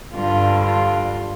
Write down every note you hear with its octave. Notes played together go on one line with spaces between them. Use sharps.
G2 D3 G3 F4
F4